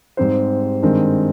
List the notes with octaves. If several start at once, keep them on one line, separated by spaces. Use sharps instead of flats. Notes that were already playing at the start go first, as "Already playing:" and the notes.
G#2 G3 C4 G4 C5
G2 D#3 G#3 C4